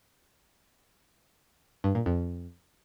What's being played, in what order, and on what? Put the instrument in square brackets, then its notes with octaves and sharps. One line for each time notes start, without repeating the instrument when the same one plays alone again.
[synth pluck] G2
A#2
F2